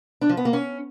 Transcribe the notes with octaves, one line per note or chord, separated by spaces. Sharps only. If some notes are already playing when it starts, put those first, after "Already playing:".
D4
F3
B3
A#3
C#4